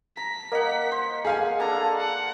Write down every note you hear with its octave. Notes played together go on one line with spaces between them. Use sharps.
A#5 B6
A#3 A#4 D#5 F#5
C5
G#4 F5 G#5
A#3 D4 A4 A#5
F#5